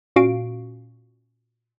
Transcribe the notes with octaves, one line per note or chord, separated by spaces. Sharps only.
A#2 C#4 F#4 F5 D7